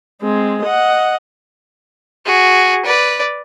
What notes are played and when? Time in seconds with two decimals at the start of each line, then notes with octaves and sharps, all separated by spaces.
0.22 G#3 C4
0.63 D#5 F#5
2.26 F#4 G#4
2.85 B4 D5